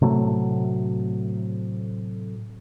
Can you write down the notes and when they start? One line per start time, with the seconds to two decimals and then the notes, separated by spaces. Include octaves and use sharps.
0.02 A2 C3 F#3 A3